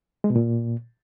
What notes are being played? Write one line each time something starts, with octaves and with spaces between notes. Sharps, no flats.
G#3
B2
A#2